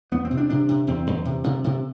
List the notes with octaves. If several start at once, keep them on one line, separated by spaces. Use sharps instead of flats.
E2 B3
C4
C3
D4
C3 D4
C3
E2 C4
E2
C3
C3
C3